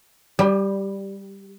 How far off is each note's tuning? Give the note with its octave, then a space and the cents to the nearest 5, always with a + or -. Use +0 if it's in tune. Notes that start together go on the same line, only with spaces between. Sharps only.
G3 +0 G4 +45